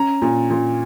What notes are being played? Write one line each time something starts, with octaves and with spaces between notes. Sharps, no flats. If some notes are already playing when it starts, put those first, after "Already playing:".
Already playing: C#4 A#5
A#2
A#2